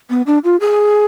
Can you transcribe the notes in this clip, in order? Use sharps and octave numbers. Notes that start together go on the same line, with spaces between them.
B3
D4
F4
G#4